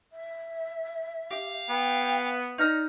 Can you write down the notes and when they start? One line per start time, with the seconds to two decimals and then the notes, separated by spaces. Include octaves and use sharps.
0.13 E5
1.31 G4 F5
1.69 B3 G5
2.58 D#4 D5 F5 A#5